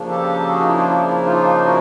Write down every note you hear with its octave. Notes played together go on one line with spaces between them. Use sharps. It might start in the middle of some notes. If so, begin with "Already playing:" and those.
Already playing: C#3 F3 A#3 D4
G4 A4
A4
F#4 G#4
D#4
E4
F4
E4
E4
D#4 F4
E4 F#4